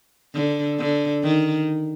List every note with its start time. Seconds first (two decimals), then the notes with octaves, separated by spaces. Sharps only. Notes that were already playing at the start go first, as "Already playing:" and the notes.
0.34 D3
0.79 D3
1.23 D#3